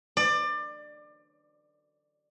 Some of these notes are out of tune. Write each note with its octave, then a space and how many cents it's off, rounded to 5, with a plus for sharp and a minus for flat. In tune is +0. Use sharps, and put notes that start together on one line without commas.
D5 +25